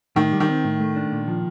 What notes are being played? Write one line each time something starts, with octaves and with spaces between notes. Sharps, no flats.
A2 D#3
G3
D#3
C4
A2
A3
D4
A#2
F3